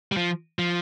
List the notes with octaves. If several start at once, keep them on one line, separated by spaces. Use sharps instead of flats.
G3
F3
F3